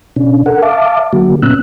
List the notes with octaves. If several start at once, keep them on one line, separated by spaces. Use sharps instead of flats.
B2 C#4 D4
A4 A#4 F#5
E5 F5 A5 D6
D3 F#3 A#3 F#4
A#2 B3 C#4 E6 F#6